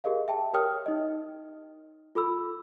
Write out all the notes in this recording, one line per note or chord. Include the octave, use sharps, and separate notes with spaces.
G4 G#4 A#4 D#5 F5
E5 G5 A5
G4 A#4 C#5 G5 D#6 F6
D#4 D#5
F4 A4 B5 E6